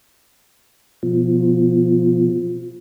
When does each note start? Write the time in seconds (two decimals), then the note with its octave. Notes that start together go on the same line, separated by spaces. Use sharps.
1.03 B2 F3